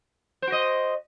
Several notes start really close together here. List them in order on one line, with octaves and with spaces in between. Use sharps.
C5 F#4 D#5